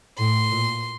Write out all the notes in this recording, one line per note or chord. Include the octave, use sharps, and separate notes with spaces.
A2 C6
A#2